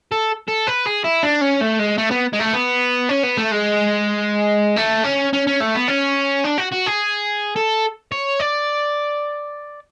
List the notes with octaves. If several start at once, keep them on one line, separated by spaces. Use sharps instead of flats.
A4
A4
B4
G#4
E4
D4
C#4
A3
G#3
A3
B3
G#3
A3
B3
C#4
B3
A3
G#3
A3
C#4
C#4
C#4
A3
B3
C#4
D4
F#4
F#4
G#4
A4
C#5
D5